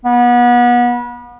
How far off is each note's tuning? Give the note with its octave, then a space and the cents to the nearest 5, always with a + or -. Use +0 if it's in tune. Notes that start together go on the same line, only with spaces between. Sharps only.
B3 -30